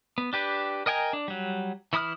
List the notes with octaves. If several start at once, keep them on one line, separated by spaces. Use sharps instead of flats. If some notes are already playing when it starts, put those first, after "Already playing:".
B3
D4 G4 B4
A#4 D#5 G5 G#5 A#5
D4
F#3 G3
E3 E4 B5 D#6 F6